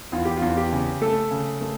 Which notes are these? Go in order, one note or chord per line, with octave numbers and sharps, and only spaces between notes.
E2 F4
G4
E2 F4
G4
C#3
A3 A4
C#3
A3